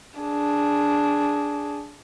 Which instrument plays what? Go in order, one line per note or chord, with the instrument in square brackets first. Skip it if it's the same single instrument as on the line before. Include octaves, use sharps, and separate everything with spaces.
[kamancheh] D4 G#4